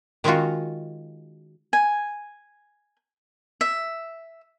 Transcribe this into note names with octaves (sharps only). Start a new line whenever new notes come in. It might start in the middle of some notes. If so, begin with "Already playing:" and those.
D#3 G#3 C#4 D#4 F4 F#4
G#5
E5